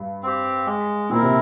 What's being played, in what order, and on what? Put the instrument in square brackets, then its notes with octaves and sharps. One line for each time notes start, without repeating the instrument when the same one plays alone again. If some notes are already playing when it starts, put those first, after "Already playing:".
Already playing: [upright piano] G2
[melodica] C4 G4
G#3
[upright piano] A#2 [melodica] C4 E4 A#4
[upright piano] C3